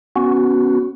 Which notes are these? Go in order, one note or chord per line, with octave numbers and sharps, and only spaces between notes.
B3 C#4 F#4